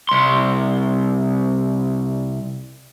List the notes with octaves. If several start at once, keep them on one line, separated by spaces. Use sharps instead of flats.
C2 C6